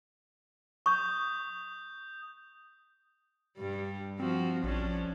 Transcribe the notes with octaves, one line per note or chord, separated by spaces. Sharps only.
C#6 D#6 G6
G2 G3
F3 C4 F#4
A#1 F3 C#4 D4